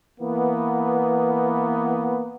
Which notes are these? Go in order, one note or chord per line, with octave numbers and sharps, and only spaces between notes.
E3 A#3 B3